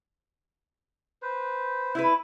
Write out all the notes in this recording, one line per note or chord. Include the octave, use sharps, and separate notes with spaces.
B4 C5
E4 B4